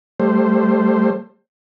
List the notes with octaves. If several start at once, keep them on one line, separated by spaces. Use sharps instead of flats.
G3 A3 C5